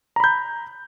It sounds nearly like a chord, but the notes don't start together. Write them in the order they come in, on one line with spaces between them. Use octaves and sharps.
A#5 B5 G6